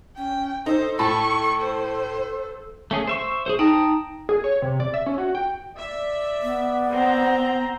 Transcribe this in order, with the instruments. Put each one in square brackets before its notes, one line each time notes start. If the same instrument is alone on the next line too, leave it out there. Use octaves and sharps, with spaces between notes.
[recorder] C#4 [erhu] G5
[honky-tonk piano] D#4 [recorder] A4 [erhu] C5
[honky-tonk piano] A2 A5 B5 [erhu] C#6
[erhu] C5
[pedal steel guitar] A3 C#4 G#4
C5 E5 C#6
G#4 A4 C5
[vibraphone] D#4 [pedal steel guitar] G5 A5 A#5
[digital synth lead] G#4
C#5
C3
D5
E5
C#4
F#4
G5
[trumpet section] D5 [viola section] E5
[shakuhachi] B3
[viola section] C4 C5 A#5